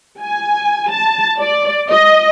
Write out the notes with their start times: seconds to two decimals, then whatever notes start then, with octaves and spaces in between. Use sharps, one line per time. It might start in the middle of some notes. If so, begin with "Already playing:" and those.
0.21 G#5
0.91 A5
1.41 D5
1.91 D#5